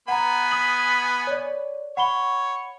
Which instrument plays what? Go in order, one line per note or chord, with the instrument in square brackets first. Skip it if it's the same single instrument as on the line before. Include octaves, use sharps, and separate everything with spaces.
[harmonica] B3 G#5 B5 [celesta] F#5 A#5
[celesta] D#6 B6 F#7
C#5 D5
[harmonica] C#5 [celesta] F#5 B5 G7